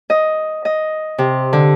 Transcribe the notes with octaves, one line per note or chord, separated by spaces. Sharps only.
D#5
D#5
C3
D3